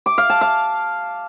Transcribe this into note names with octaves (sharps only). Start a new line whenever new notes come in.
D6
F5
A5
F5